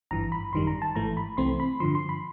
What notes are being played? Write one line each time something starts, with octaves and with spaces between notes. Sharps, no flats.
G#1 G2 E3 A#5
B5
G#1 F#2 D#3 G3 C6
A#5
A5
G#1 G#2 E3 A3 A#5
B5
C2 C3 E3 A3 C4 C6
B5
G2 D3 F3 C6
C6
B5